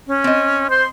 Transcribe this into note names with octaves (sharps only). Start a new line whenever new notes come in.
C#4
C4 D#5
C5 C6